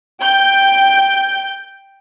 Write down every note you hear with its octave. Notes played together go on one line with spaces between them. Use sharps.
G5 G6